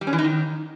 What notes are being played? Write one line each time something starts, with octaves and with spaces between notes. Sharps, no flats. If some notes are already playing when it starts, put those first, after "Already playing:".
G3
C#4
E3
D#4
D#3